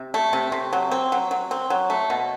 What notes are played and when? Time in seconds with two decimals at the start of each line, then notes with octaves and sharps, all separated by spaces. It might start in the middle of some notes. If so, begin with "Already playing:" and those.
Already playing: C3
0.14 A3
0.33 C3
0.52 C3
0.73 F#3
0.91 C4
1.12 F#3
1.31 F#3
1.51 C4
1.70 F#3
1.90 A3
2.10 B2